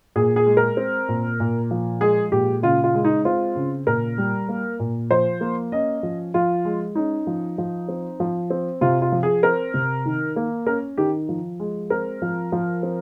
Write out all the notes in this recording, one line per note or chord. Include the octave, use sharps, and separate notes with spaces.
A#2 G#4
G#4
G#3
A#4
C4
A#2
A#2
F3
G#3 G#4
A#2 G4
C#3 F4
F4
G#3
D#4
C4 F4
C#3
A#2 A#4
G3
A#3
A#2
F3 C5
A#3
C#4 D#5
F3
F3 F4
G#3
C#4 D#4
F3
F3
C4
F3
C4
C3 F4
F4
F3
G#4
C4 A#4
C3
D#3
A#3
C#4 A#4
D#3 G4
F3
G#3
C4 A#4
F3
F3
C4